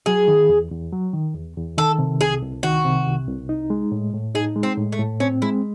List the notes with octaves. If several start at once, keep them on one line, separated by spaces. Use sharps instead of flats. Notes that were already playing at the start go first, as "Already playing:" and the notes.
F#3 G#4
D#3
E2
E2
F#3
D#3
E2
E2
D#3 A4
C3
C2 G#4
C2
D#3 F#4
C3
C2
C2
D#4
G#3
A2
A2
D#4 G#4
G#3
C4
A2
A3
A2
C4 C#4
G#3 E4